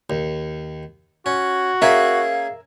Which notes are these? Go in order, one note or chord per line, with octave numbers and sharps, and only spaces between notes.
D#2
C#4 F#4
A#3 C#4 G#4 A#4 E5 F5